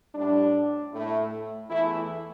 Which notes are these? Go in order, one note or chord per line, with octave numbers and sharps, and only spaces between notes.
A2 G3 D4
A2 A3
E2 E3 A3 E4